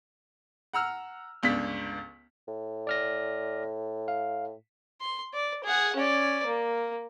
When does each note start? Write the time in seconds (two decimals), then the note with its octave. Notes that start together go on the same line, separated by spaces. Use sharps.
0.73 F#5 A#5 E6 F6
1.43 G1 C#2 D4 B6
2.47 A2
2.87 D5 F6 A#6
4.08 F5
5.01 C6
5.34 D5
5.64 G#4 F#5
5.96 C#4 D5
6.46 A#3